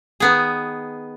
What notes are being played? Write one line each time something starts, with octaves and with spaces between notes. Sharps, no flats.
D#3 B3 G#4